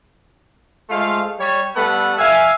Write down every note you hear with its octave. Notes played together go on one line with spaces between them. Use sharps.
G#3 A3 F4 C5 F5
G3 C#5
G3 A3 B3 A4 B4 F#5
E5 F5 G#5